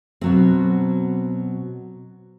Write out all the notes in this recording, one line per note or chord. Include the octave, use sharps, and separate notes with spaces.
B2 F#3 C4